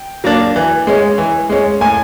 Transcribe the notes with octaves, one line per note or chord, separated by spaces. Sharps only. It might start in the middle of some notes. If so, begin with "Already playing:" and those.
Already playing: G5
F#3 A#3 D4
E3
G#3 C#4
E3
G#3 C#4
A2 G#5